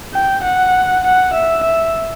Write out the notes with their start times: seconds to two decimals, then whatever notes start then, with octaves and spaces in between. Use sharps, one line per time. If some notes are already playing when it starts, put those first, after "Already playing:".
0.14 G5
0.43 F#5
1.04 F#5
1.34 E5
1.63 E5